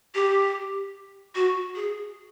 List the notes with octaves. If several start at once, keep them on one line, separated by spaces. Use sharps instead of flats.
G4
F#4
G#4